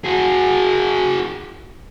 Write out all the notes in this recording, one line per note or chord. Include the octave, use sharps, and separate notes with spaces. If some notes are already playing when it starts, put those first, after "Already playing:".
F#4 G#4